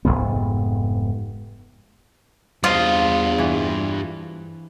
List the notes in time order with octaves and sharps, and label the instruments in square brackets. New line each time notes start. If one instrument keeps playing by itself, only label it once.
[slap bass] F1 E2 G#2 B3
[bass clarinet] E2 [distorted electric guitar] G2 D#5 [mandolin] F4 [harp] C5 F5
[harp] E3